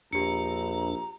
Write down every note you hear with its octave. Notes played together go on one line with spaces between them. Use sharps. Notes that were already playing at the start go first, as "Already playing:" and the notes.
A#1 E2 D4 G4 A#5 C#7